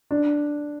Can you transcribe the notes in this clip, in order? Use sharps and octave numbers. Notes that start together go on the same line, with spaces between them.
D4